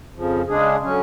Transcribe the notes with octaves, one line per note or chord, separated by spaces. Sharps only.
F2 C#3 F3
C#3 G#3 D4 G#4
D3 F#3 C#4